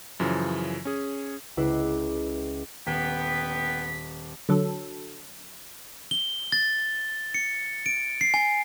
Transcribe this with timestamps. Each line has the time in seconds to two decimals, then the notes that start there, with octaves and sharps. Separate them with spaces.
0.20 F#2 C#3 E3 F3
0.85 C#4 G#4
1.57 C#2 E4 B4 D6 E6 C7
2.87 D#1 D3 B3 G5 B6
4.49 D3 F#3 A4
6.11 G7
6.52 A6
7.34 C#7
7.86 D7
8.21 C7
8.34 G#5